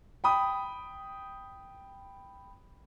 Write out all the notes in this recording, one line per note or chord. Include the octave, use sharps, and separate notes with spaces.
G5 B5 D#6